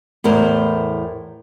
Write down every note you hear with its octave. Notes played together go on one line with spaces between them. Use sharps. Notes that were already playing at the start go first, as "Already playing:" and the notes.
E2 A2 A#4 C5